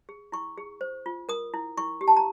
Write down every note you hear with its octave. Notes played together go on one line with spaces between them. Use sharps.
G#4
E4 C#6
G#4
C5
F4
A#4 D#6
E4
E4 C#6
G4
A5
A#5